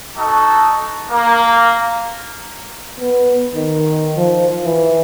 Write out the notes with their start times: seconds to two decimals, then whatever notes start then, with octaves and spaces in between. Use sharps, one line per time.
0.17 D#4 F#4 A4
1.11 A#3
3.00 B3
3.55 D#3
4.17 F3
4.65 E3